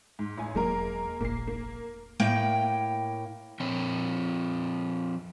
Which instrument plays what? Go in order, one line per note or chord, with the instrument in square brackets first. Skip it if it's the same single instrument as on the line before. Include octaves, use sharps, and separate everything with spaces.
[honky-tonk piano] G#2
A1 G#5
[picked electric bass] E1 F#3 [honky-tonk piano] G#3 A#3 A#4
[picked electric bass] F1 A#1 [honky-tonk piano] A#3 C7
[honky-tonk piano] A#3
[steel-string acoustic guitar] A2 A#3 G5
[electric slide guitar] F3 C4 C#5